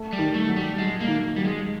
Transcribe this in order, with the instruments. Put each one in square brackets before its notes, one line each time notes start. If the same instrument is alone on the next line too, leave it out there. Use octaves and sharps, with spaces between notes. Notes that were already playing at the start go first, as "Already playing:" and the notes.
Already playing: [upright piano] A3
[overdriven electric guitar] G3
[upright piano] D#3
[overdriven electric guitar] A3
[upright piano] F#3
[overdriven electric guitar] G3
[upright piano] F#3 [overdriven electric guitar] G#3
[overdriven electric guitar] A#3
[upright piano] D#3
[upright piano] F#3 [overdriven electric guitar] G3
[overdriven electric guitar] G#3